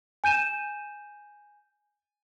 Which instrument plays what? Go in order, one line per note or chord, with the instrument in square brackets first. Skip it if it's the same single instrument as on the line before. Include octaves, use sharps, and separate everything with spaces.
[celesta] G#5 G6 D#7 E7